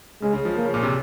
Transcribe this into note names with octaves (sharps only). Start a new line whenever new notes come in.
C#3 G#3
C#3
F3
F3 A#3
C#3
A#2
C3